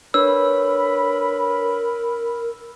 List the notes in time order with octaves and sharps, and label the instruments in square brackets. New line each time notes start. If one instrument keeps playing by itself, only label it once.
[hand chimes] D4 B4 C#5 [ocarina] A#4 [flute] B5 [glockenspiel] E6